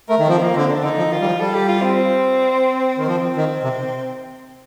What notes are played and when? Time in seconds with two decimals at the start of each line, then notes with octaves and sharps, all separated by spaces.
0.09 A3 A#4
0.19 D#3
0.28 F3 C4
0.42 A#3
0.56 D3 C4
0.71 D4
0.84 D3 D#4
0.98 F3
1.12 D#3 F4
1.20 G3
1.26 F3
1.41 G3 A4
1.54 G4
1.68 F4
1.82 C4
2.98 D#3
3.08 F3 C4
3.36 D#3
3.63 C3